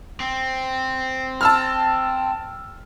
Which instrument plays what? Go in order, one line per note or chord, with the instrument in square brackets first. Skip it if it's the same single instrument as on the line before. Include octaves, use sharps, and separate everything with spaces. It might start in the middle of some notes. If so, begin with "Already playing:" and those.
[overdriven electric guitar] C4
[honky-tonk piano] A5 E6 F6